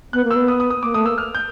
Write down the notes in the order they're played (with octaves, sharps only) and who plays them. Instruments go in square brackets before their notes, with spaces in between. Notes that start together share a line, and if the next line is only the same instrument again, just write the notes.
[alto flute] B3 [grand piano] F#6
[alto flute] A#3
[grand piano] E6
[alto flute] B3
[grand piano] D#6
D#6
D#6
[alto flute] A#3 [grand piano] D6
[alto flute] A3 [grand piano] D#6
[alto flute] A#3 [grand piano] E6
[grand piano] F6
G6